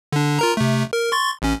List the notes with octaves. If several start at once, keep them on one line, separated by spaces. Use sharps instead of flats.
D3 D4
F4 A#4 A#5
C3 A3
A#4
C6 C#6 A6
A1 C#4